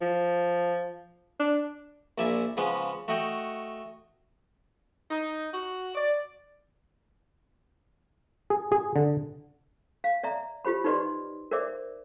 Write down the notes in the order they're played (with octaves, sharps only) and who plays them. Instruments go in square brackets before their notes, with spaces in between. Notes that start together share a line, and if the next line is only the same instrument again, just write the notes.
[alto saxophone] F3
D4
[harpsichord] A#1 A#2 D5 E5 G#5
C#3 F3 G#3 B3 C#4
A3 F#4 D#5 F#5 G5
[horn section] D#4
F#4
D5
[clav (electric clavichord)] G#4
G#4
D3
[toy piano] F5
D5 E5 A#5
F4 G4 C5 B5
D#4 G4 B4 D5 D#5 C6
A#4 C5 D5 E5 D6